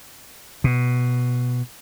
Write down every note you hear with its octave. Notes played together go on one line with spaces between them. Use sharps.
B2